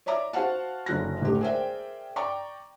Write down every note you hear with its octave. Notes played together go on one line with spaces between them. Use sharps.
C#5 D5 E5 A#5 D6
F#4 C5 F5 F#5 A5
F#1 D3 F#3 F#6 A#6
E1 A1 D3 G4
G#4 A#4 C5 D5 E5 G5
D5 G5 A#5 C#6 D6